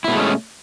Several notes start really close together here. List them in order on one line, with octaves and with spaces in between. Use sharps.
E4 B2 A3 G#3 C#4